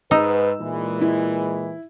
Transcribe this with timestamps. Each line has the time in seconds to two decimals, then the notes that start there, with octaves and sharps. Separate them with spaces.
0.11 G#2 D#4 B4 E6
0.60 A#2 E3 G#3
1.01 E4